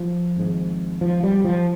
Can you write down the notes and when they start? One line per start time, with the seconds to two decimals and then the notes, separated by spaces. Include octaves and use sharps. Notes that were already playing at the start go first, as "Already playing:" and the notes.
Already playing: F3
0.37 G#1 G#2
1.01 F3
1.23 G3
1.44 F3